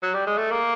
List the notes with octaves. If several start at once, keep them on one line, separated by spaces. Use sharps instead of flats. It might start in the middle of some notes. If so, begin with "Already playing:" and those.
F#3
G3
G#3
A3
A#3